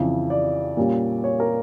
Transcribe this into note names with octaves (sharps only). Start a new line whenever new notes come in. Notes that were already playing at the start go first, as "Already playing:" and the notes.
Already playing: F2 C#3 E3
D5
A#2 G3 A#3 C#4
C#5
A#4